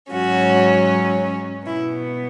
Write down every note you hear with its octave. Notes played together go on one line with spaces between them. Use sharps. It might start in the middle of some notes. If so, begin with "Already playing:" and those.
G#2 F#3 C#4 F#4
B2 B3 E4